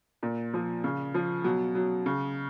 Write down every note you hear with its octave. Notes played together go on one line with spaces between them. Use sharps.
A#2
F3
C#3
F3
B2 F#3
F#3
C#3